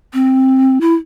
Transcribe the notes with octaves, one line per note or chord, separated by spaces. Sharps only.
C4
E4